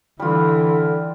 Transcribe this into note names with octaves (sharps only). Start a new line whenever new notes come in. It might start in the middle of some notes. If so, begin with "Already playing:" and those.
D3 E3 G3 F4